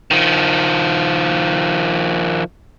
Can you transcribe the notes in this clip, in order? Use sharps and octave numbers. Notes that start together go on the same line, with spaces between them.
D#3 F3